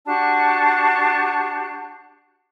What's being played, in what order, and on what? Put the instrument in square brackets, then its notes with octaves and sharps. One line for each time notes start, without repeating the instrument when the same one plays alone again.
[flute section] D4 F#4 G4 A5